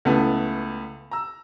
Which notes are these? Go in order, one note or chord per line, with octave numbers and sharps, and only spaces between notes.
C#2 A3 B3 E4
A#5 E6